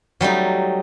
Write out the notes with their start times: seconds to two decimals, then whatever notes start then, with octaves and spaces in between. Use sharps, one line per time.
0.21 F#3 G3 A3 D#4